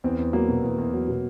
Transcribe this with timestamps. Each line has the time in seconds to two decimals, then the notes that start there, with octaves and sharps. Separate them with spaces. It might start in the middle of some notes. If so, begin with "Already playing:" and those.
0.04 E2 C4
0.19 E2
0.33 F#3 A#3
0.49 B2
0.63 E2
0.78 E2
0.93 F#3
1.08 B2